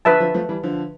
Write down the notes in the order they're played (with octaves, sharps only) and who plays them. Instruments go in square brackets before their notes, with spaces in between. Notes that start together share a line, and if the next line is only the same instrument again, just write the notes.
[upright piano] D3 F3 [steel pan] B4 E5 A5
[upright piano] D3 F3
F3 A3
E3 G3
D3 F3